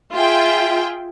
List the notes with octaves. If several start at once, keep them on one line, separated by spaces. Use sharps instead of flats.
F4 G#4 E5 G5